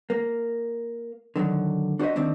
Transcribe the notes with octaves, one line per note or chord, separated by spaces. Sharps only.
A#3
D3 D#3 F3 F#3
D4 F#4 C5 C#5 D#5 E5
D#3 A#3 C4 D4